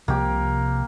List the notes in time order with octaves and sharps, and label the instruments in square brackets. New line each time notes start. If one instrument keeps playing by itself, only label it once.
[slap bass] C2 C3 F3 [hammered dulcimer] A#3 G4